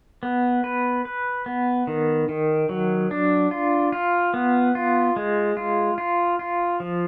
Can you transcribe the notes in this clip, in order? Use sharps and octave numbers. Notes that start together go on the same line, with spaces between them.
B3
B4
B4
B3
D#3
D#3
F#3
D4
F4
F4
B3
F4
G#3
F4
F4
F4
F3